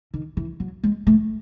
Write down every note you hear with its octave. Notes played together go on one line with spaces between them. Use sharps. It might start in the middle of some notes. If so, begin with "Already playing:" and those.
D#3
E3
F#3
G#3
A3